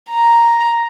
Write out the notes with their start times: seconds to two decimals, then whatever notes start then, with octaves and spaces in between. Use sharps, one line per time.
0.10 A#5